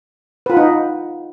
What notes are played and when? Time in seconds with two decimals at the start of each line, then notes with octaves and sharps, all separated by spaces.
0.46 B4
0.50 F4
0.53 F#5
0.57 D#4